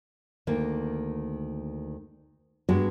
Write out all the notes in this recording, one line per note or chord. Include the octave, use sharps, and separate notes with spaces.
D2 D#3 A#3
G2 G#3 B3 D4 F#4